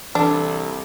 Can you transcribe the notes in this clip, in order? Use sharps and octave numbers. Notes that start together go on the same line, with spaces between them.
C2 E3 D4 A4